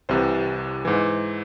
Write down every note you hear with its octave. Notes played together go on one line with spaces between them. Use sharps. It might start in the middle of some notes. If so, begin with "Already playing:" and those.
C2 C3 E3 C5
G#2 E3